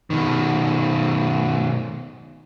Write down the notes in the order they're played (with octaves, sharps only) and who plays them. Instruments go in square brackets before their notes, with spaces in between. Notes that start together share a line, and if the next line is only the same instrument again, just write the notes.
[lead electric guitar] B2 D#3